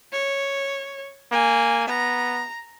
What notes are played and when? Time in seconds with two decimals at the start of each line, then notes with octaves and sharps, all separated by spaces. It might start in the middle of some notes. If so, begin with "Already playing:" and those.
0.13 C#5
1.32 A#3 G#5
1.88 B3 A#5